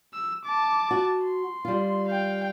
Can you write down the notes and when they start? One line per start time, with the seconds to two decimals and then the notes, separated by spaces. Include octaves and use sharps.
0.14 E6
0.45 A5 D6
0.91 F#4
1.24 C6
1.65 G3 F4
2.09 F5 G5